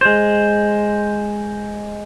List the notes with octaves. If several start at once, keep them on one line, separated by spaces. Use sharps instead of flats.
G#3 C5